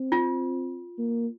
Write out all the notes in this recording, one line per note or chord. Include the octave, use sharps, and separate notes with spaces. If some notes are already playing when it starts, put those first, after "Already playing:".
Already playing: C4
F4
A#3